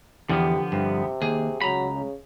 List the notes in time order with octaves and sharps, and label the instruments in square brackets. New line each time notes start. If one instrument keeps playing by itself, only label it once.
[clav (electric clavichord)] E2 [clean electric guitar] D3 F3 B3 [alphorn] G4
[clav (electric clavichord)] G2 [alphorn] C3
[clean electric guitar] D#2 [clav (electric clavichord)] G#4
[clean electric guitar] C#2 A#5 B5 [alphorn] F#3
[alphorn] C#3